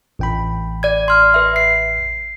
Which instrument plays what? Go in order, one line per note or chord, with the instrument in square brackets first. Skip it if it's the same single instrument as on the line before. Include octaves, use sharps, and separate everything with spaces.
[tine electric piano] A1 G5 B5
[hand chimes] D5 G#6
C6 F6
B4 E5
C7